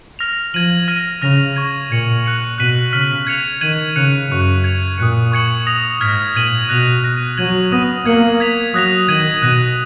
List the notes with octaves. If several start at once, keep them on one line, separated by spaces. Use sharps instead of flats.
F6 A#6 F7
F3 G#6 D#7 F#7
F6 A#6 D#7
C#3 F6 A#6 F7
C#6 G#6 D#7
A#2 G#6 C#7 F#7
F#6 C#7 F#7
B2 F#6 B6 D#7 F#7
C#3 F6 B6 F#7
G#6 C#7 F7
D#3 G#6 D#7 F#7
C#3 F#6 C#7 F7
F#2 C#6 F#6 C#7 F7
G#6 C#7 F7
A#2 D#6 F#6 C#7
C#6 G#6 C#7 F#7
D#6 A#6 F7
G#2 F6 G#6 B6
A#2 G#6 D#7 F#7
B2 F#6 A#6 F7
F#6 A#6 D#7
F#3 G#6 D#7 F#7
B3 D#6 A#6 D#7 F#7
A#3 G#6 C#7 F#7
G#6 B6 F7
F#3 D#6 F#6 A#6 F7
D#3 G#6 D#7 F#7
B2 F#6 A#6 D#7 F#7